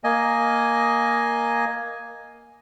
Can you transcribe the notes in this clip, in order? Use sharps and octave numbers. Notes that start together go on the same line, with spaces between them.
A#3 D#5 G#5